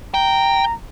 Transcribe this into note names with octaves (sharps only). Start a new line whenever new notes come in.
G5 A#5